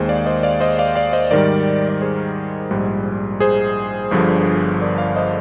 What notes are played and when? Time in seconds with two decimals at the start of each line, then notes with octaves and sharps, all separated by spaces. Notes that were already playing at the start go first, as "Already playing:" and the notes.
Already playing: D#2 D#3 G#3 G#4 C5
0.09 D5 F5
0.26 C5 D#5
0.43 D5 F5
0.61 C5 D#5
0.79 D5 F5
0.95 D5 F5
1.13 C5 D#5
1.31 G#2 D#3 G3 A#4 D5
1.89 D5
2.02 G#4 C5
2.71 A#1 G#2 G3
3.40 G#4 C5
4.11 G1 G2 D3 F3
4.81 A#4 D5
4.98 D5 F5
5.16 C5 D#5